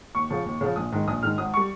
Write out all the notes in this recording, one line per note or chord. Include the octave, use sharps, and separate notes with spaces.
D#2 C#6
C#3 F3
D#2
C#3 F3
A#1 D#6
G#2 D#3
A#1 D#6
G#2 D#3 F6
G#1 D#6
G3 C#6